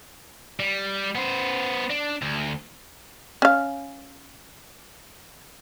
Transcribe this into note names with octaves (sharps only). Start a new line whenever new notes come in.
G3
B3 C5
D4
D2
C#4 F5